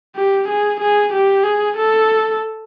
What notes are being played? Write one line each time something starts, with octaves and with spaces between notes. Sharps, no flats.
G4
G#4
G#4
G4
G#4
A4